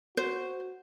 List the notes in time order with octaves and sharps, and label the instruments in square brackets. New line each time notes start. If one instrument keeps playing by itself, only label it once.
[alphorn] F#4 [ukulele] C5